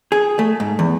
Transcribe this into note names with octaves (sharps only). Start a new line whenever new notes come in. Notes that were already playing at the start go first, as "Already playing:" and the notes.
G#4
A3
G#2
E2